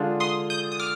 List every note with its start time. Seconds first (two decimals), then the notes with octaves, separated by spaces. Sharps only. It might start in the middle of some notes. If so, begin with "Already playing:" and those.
Already playing: D3 G#3 D4 F4
0.20 C6 D#6
0.50 D#6 G6
0.72 D#6
0.80 D6 F6